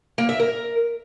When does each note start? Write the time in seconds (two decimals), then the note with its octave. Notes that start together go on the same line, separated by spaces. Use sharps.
0.18 A#3
0.29 E5
0.40 A#4